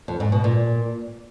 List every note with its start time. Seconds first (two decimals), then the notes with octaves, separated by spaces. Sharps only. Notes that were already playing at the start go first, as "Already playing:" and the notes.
0.08 F2
0.20 G#2
0.32 B2
0.44 A#2